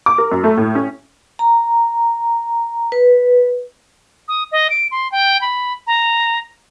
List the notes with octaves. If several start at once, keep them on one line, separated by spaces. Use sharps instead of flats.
D6
A#4
F#2
A3
A2
C#4
A#5
B4
D#6
D#5
D7
C6
G5
B5
A#5